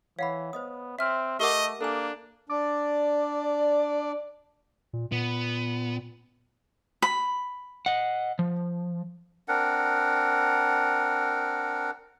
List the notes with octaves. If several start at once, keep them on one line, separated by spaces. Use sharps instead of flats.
E3 C#5 F5 F#5 B5
B3 C5 D#5 D#6
C4 E5 F6
A3 G4 A#4 D#5 F#5 D6 G7
A#3 D4 A4 G#5
D4 D5
A#2
A#2 B3
B5
D#5 F#5
F3
C4 D4 A#4 F#5